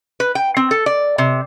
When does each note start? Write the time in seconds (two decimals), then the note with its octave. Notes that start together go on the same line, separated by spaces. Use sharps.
0.20 B4
0.35 G5
0.57 C4
0.71 A4
0.86 D5
1.18 C3